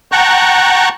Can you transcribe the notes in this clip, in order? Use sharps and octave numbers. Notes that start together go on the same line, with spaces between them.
F#5 G5 A5 A#5 C#6 F#6